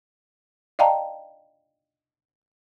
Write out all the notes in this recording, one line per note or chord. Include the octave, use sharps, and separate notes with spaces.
D5 D#5 F5 G5 A5 A#5